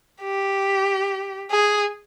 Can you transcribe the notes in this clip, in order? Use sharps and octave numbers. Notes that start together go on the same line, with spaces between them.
G4
G#4